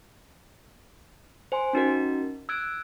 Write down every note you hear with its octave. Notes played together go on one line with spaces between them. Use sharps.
C5 G#5 C6
C#4 D#4 F#4 A#4
E6 F#6 G#6 D7